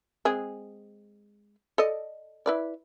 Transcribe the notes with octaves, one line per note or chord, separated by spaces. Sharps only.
G#3 C4 G#4
A4 D5 D#5
E4 B4 D5